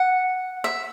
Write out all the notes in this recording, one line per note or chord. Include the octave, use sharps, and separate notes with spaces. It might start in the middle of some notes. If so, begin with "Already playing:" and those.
Already playing: F#5
E5